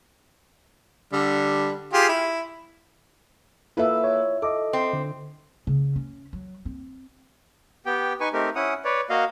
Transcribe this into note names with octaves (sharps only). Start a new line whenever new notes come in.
D3 G3
F4 G4 G#4
E4
A#3 E4 F4 A4 B4 E5
C#5
A4 D#5 D6
C4
D3
C#3
C#4
F#3
C4
B3 G4 G5
D#4 B4 G#5 C#6
A3 C4 D#4 G4 A#4
C#4 E4 F#5 D#6
B4 C#5 D5
A#3 F#4 D#5 F5